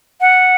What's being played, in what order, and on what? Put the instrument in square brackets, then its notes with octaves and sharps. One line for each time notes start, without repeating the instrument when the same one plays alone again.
[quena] F#5